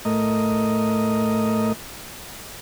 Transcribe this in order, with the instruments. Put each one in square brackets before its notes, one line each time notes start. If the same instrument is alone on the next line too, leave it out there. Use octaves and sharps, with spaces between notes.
[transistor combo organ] A2 A3 A#4 D#5